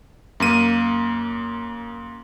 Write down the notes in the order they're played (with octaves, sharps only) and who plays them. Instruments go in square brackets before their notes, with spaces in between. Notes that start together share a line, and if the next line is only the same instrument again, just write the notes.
[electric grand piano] F#2 A#3 D#7